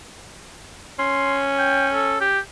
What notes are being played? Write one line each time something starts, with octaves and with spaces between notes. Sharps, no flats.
C#4 C6
G5
A4
G4